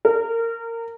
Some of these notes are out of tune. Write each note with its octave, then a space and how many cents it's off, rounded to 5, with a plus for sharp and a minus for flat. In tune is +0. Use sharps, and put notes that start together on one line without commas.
A#4 -25